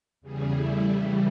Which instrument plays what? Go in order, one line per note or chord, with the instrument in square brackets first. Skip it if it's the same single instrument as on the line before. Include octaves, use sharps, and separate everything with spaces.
[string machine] E2 C#3 G3 G#4
G3 A3 E4
C#3 E3 G3